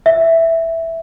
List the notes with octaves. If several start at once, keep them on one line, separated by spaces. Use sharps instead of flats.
E5